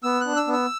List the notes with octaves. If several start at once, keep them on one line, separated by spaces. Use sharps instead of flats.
B3 E6
F#6
D4
E6
B3
E6